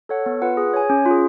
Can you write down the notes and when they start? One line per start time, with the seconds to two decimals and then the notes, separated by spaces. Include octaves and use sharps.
0.09 A4 C#5 F#5
0.26 B3
0.42 F4 B4 F#5
0.57 G#4
0.74 C#5 G#5
0.90 C#4
1.06 F4
1.11 G#4